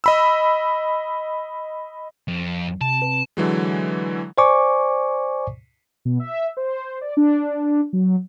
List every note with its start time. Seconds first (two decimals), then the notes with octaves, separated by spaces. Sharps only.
0.04 D#5 B5 E6
2.28 F2
2.81 C3 A5
3.02 B4
3.37 D3 E3 F#3 G#3
4.38 C5 D5 G#5 C#6 D6
6.05 B2
6.20 E5
6.57 C5
7.01 D5
7.17 D4
7.93 F#3